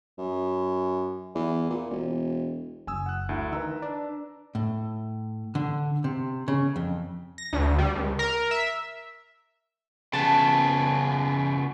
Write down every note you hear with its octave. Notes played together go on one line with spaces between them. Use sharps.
F#2
E2
A#2
E1
F#1 G#5 D#6 E6
F#5 F#6
D2 E4
D#3 B4 A#5 E6
D4
A2
D3
C3
C#3
F2
A#6
D2
G3
C#2
A#4
E5
C#3 B3 A5